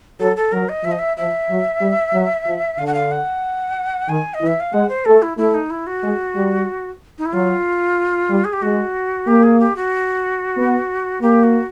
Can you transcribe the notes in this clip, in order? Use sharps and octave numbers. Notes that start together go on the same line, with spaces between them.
F#3 A4
A4
F#3 A#4
D#5
F3 E5
D#5
E5
F3 E5
F#3
G3
F#3
F3
D3 F5
F#5
F5
F#5
D#3 G#5
D#5
E3
E5
F5
G#3 F#5
C5
A3 A4
E4
A3 E4
D#4
E4
F#4
G#3
G3
D#4
E4
F#3 F4
G3
G#4
G4
G#3 F#4
A#3 G4
G#4
G4
F#4
B3
A#3 G4
F#4